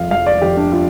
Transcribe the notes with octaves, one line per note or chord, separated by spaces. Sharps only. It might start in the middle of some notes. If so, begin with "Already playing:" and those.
Already playing: F1 F2 F3 F5
F1 F5
D5
F2 F3 G4
D4
F4